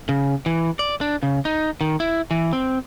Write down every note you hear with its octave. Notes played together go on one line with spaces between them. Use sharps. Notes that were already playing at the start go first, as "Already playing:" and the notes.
C#3
E3
D5
D4
C#3
D#4
D#3
E4
E3
C4